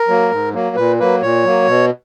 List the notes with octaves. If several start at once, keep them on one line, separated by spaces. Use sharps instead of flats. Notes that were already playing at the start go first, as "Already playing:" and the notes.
Already playing: A#4
F#3 A#3
G#2
F#3 A#3
A#2 B4
F#3 A#3 B4
A#2 C#5
F#3 A#3
B2